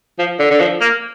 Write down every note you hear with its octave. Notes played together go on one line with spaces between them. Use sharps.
F3
D3
D3
F3
A#3